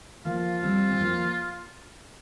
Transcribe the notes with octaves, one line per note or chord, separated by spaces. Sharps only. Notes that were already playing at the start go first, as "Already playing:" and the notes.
F3 A#3 F4
G3 C4
C4
F3 A#3